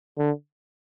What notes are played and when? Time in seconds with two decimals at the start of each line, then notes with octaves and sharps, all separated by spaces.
0.18 D3